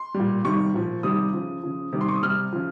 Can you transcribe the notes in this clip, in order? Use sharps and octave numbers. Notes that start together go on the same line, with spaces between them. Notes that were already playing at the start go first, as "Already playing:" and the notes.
Already playing: C6
A#2 G3
C3 D#3 G3 C#6
A#2 F3
C3 D#3 G3 D#6
C#3 F3
C#3 F3
C3 D#3 G3
C6
C#6
D#6
C3 G3 F6
C#3 F3